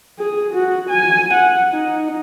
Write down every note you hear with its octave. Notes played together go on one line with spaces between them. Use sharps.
G#4
F#4
G#5
F#5
D#4